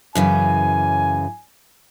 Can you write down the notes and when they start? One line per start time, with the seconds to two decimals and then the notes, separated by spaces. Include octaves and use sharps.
0.15 F#2 C#3 E3 G#5